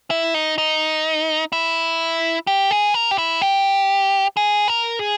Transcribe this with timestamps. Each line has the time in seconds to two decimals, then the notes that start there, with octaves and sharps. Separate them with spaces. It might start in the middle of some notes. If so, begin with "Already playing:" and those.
0.10 E4
0.34 D#4
0.58 D#4
1.52 E4
2.47 G4
2.71 G#4
2.94 A#4
3.11 G4
3.18 E4
3.41 G4
4.37 G#4
4.68 A#4
4.99 G#4